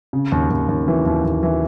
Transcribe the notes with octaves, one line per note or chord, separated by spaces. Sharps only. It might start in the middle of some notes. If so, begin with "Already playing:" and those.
C#3
D#2
D#2
D#2
E3
D#2
D#2
E3